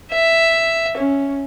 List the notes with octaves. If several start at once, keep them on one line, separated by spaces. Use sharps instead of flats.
E5
C#4